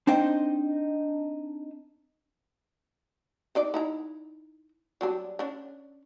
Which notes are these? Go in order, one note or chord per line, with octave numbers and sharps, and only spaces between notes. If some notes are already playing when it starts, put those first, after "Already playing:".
C4 D4 D#4 C5 G5
D#3 D4 D5
D#4 E4 A#5
F#3 G3 D4
C#4 D4